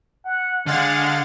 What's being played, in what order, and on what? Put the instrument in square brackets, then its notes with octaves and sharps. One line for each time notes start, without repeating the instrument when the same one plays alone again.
[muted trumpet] F#5
[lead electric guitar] D3 [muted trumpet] G#3 [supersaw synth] F5 F#5 A6